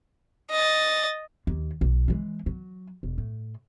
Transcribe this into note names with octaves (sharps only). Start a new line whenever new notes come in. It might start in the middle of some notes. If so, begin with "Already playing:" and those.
D#5 A6
D#2
B1
E3 G#3
F#3
E1
A2